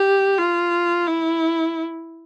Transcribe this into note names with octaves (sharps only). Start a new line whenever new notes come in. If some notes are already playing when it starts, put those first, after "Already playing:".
Already playing: G4
F4
E4